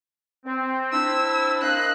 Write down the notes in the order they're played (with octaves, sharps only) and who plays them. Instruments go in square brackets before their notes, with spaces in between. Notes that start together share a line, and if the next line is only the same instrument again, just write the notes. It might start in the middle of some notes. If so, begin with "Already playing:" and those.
[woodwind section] C4
[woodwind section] C4 D4 E4 [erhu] E6
[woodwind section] A#3 C5 D#5 [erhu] F#6